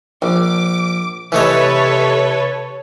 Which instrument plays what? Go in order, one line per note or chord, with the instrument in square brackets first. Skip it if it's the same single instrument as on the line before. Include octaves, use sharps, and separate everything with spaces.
[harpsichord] A#1 [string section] D6
[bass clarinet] C3 [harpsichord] E3 A3 D#5 [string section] A4 B4 C#5